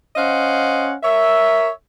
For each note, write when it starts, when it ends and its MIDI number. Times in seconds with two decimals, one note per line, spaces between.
0.16 0.94 61
0.16 0.94 72
0.16 0.94 75
0.16 0.94 77
0.16 0.94 78
1.03 1.69 70
1.03 1.69 73
1.03 1.69 76